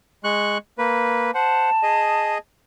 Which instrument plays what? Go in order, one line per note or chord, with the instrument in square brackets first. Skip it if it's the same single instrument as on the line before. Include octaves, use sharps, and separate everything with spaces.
[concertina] G#3 C#6 F#6
A#3 B4
[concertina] C5 F#5 [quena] A5
[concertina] G#4 D#5